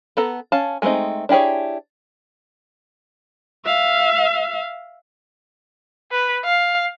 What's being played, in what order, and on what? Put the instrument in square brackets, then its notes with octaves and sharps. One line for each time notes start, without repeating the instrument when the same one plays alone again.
[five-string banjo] B3 A4 A#5
C#4 F5 A5
G#3 A3 B3 C4 D#4
D4 E4 G4 G#4 C#5
[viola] E5 F5
[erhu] B4
F5